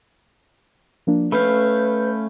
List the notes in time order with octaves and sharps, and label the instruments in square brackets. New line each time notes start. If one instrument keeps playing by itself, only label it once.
[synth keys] F3 A#3 D4
[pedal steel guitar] A3 C#4 F5 [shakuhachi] B4 [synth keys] B5 G6